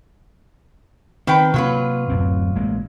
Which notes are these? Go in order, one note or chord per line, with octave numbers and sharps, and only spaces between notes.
D#3 C4 B4 G5
C3 F#3 A#3 F4 B4
D1 F#2 C4
A1 G#3 A#3